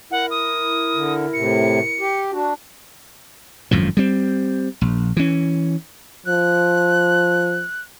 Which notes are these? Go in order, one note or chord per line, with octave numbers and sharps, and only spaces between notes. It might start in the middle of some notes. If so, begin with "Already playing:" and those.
E4 A#4 F#5
D#6
D3
A2 C3 C#7
G4
D4 F#4
G#1 F#2 A2 F3
G3 C4
A#1
E3 C#4
F3 F#6